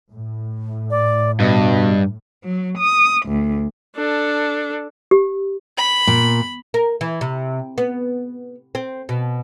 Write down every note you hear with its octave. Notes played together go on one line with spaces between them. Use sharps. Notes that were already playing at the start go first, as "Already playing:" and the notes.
A2
D5
G2 B2 D#5
F#3
D#6
D2
D4 A4
G4
B5
A#2
A#4
E3
C3
B3
C4
B2